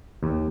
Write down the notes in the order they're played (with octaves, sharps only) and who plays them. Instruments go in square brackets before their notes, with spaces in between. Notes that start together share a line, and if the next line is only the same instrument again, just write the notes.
[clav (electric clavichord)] D#2